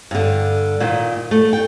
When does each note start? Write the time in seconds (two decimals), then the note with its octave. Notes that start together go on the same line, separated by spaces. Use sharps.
0.11 G2 D3
0.80 A#2 D#3
1.31 A3
1.53 G5